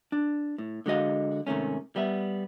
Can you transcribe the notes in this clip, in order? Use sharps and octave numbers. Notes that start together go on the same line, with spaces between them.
D4
A2
D3 G#3 F#4 D#5 F5
G#2 C3 D#3 A3 C#4
G3 B3 E5